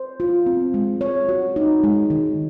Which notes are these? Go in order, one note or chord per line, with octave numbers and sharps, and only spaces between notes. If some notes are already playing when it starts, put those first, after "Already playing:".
Already playing: C5
F4
C4
G#3
C#5
F#4
D#4
G#3
D#3